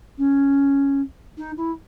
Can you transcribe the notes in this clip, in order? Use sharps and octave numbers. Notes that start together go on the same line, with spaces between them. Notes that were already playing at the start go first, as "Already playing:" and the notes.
C#4
D#4
E4